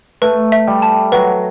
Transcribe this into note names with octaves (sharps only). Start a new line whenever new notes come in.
A3 B4
E5
G3
A5
F#3 B4